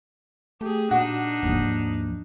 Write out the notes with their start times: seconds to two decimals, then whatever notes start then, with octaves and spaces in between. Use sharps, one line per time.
0.61 A3 G4 G#4
0.91 A#2 D4 D#4 F#4
1.43 D#2 G#2 F3